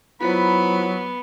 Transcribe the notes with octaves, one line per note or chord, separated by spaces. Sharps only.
F#3 B3 E4 F4 C5 B5